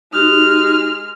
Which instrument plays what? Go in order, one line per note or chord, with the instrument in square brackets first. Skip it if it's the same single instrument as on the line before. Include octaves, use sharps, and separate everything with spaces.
[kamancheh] G#3 F6 [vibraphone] D#4 F#4 G4